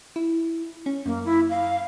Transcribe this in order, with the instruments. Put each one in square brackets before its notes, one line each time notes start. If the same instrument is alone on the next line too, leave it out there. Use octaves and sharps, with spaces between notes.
[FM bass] E4
C#4
[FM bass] F#2 [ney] A#3
[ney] E4
F5